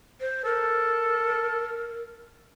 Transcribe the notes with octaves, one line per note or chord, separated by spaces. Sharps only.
C5
A4 A#4